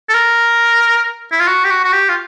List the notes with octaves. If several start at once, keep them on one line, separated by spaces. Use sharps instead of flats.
A4
A#4
E4
F4
F#4
G4
F#4
F#4
G4
F4